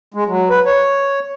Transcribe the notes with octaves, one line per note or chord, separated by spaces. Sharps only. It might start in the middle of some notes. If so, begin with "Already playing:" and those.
G#3
F#3
B4
C#5